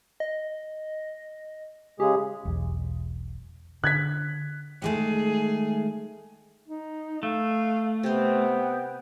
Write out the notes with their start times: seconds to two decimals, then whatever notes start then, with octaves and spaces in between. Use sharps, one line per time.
0.20 D#5
2.00 C#3 G#3 G4 G#4
2.45 E1 B1 E2
3.84 D3 F#6 G#6 B6
4.82 D#3 G#3 A3 G#4
6.68 D#4
7.23 A3 F5
8.03 C3 B3 C5 G5